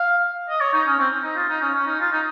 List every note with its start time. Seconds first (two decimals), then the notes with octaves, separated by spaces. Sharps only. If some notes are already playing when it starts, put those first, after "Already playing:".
Already playing: F5
0.49 D#5
0.61 C#5
0.73 D#4
0.87 C#4
0.99 C4
1.24 D#4
1.36 F4
1.49 D#4
1.62 C#4
1.74 C#4
1.86 D#4
2.00 F4
2.12 D#4